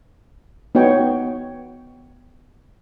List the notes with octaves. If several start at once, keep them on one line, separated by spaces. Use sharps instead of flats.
B3 D#4 F#4 C#5 G5